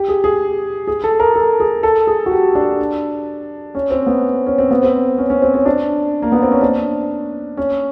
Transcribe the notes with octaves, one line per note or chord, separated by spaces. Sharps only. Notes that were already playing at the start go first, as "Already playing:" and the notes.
Already playing: G4
G#4
G#4
G#4
A4
A#4
A4
G#4
A4
G#4
F#4
G4
D4
C#4
C4
B3
C#4
C4
B3
C4
C#4
C#4
C4
C#4
D4
A#3
B3
C4
C#4
D4
C#4